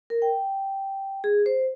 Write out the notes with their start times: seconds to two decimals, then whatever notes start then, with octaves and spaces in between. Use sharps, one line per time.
0.10 A#4
0.22 G5
1.24 G#4
1.46 C5